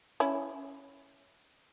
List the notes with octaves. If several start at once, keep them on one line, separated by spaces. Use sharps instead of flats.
C#4 E4